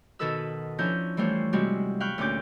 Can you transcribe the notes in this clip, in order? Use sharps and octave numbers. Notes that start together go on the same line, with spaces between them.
B2 D#3 D#4 A4 B4 E6
F3 C#4 D4 E4 A#5 G6
E3 G3 A3 F4 C5 C#5
C3 G3 G#3 C4 E4 F#4
F5 G5 B5 C#6 F#6
D2 A#2 C#4 D6 G6